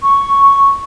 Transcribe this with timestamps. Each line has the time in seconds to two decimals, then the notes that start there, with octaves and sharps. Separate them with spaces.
0.03 C#6